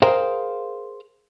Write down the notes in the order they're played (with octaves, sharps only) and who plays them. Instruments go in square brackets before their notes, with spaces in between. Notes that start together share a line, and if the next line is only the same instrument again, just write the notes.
[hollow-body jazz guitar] G#4 A#4 C5 F5 G5